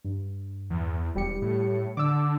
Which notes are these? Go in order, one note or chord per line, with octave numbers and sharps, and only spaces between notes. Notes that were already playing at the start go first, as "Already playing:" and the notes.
G2
E2
E1 G3 G4 C#7
A2
D3 D6 E6